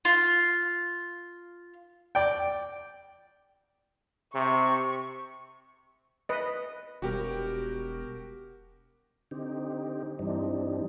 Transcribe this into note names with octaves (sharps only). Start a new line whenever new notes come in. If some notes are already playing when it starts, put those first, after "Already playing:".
F4
D5 G5
C3 C#6
B4 D#5
E1 B2 G3 F#4 G4 A#4 G5
D3 C4 D#4 G4
G2 E3 G3 C4 D4 D#4